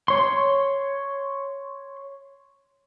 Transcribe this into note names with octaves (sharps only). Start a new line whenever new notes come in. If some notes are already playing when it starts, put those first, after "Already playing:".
C#5 C6